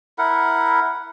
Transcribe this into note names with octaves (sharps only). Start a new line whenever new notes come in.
E4 A#4 F#5